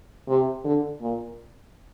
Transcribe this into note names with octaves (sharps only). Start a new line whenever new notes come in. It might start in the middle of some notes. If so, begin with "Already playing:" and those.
C3
D3
A#2